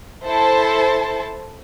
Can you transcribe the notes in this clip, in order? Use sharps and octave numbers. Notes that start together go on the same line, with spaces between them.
E4 A4 C5 A5